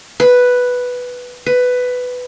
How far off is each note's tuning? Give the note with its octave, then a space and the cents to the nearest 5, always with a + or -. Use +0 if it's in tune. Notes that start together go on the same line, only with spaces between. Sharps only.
B4 +0
B4 +10